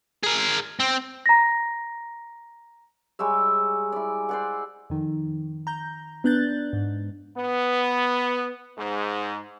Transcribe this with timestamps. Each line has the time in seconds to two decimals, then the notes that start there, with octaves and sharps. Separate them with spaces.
0.23 G#4 A#4
0.80 C4
1.26 A#5 A#6
3.19 G3 G#3 C#5 E5
3.92 E4 D5
4.29 C5 D5 F#5
4.90 F2 D#3
5.67 A#5 G6
6.24 B3 D4 F#6 G6 A6
6.73 G#2
7.37 B3
8.78 G#2